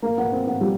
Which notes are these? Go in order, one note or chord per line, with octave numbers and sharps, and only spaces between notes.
A#3
B3
C4
B3
G3